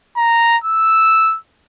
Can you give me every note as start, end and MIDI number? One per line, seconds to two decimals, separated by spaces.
0.17 0.57 82
0.64 1.37 88